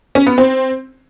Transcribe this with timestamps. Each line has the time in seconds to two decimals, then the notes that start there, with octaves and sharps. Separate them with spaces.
0.15 C#4
0.27 B3
0.38 C4